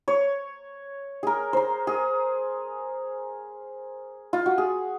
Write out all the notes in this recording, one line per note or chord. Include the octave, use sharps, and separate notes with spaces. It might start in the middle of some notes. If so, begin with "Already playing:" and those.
C#5
G#4 A#4
A#4 C5
G#4
F4
F#4
G#4